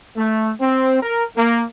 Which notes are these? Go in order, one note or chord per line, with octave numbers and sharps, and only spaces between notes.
A3
C4
A#4
A#3